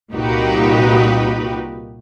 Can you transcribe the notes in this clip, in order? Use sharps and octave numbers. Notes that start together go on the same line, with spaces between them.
C2 A#2 D#4 F#4 G4 B4